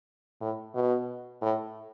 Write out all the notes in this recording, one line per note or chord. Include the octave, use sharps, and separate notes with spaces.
A2
B2
A2